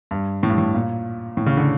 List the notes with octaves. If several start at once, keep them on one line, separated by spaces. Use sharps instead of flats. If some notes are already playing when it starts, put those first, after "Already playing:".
G2
A2
G2
A2
A#2
A2
C#3
D3